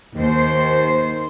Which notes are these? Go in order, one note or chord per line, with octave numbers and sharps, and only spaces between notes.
D#2 C5